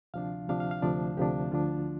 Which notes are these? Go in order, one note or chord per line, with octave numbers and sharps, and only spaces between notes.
D2 C3 F3 D4 F5
D2 C3 F3 D4 F5
F5
F5
D2 C3 F3 D4 D5
D2 C3 F3 D4 G4
D2 D3 F3 D4 F4